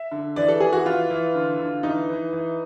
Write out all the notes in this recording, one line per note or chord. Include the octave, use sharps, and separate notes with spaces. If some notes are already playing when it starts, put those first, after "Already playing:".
Already playing: E5
D3
E3 D5
A4
E3 G#4
F#4
E3 F4
E3
D3
D3
E3 D#4
E3
E3